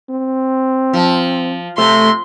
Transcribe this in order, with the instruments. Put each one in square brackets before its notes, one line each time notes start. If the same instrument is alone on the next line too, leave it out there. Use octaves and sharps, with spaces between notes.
[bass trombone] C4
[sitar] F3
[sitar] C3 [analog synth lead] A3 [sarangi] C6